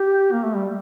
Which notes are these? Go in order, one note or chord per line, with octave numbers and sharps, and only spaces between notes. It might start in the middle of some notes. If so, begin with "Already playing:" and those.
Already playing: G4
A#3
A3
G3